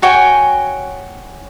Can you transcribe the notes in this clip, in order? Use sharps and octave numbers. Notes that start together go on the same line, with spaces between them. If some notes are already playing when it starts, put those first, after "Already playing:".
F#4 C#5 G5 G#5